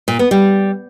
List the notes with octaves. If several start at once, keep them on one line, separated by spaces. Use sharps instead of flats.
A#2
B3
G3